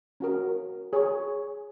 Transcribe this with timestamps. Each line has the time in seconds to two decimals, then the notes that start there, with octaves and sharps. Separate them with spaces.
0.20 C#4 F#4 A#4
0.93 G#4 C#5 G#5 C#6